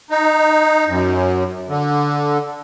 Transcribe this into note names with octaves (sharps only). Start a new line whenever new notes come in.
D#4
F#2
D3